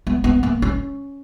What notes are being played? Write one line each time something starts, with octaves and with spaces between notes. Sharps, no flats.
B3
B3
A#3
C#4